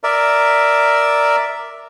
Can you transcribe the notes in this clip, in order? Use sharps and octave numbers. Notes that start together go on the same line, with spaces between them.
A#4 D5 E5